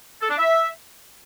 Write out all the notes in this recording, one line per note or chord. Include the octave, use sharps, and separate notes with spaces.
A4
D4
E5